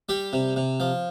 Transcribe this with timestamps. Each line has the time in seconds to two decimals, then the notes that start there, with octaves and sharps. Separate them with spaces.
0.09 G3 G4
0.33 C3
0.56 C3
0.80 F3